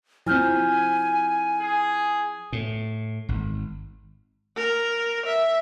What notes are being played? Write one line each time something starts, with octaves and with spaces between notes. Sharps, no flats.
F3 C4 E4 G#5 F6 G6
G#4
A2
G#1
A#4
E5